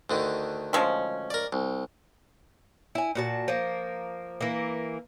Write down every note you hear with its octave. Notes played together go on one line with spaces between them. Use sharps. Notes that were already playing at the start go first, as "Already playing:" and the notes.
D2 D3 D#3
F3 G#3 C#4
A#4 D5
C2
E4 G#5
A#2 F#4 A5
F3 A#3
E3 A#3